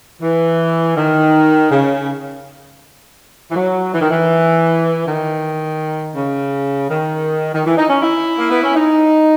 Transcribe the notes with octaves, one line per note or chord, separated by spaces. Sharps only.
E3
D#3
C#3
E3
F#3
E3
D#3
E3
D#3
C#3
D#3
D#3
E3
D#4
C#4
E4
A#3
B3
C#4
D#4